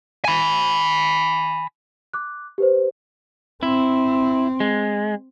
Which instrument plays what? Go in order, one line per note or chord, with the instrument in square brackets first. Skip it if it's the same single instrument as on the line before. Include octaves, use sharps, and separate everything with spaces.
[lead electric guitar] G#5 B5
[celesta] D6 F#6
G4 B4 C5
[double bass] C4 [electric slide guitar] E4
[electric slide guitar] G#3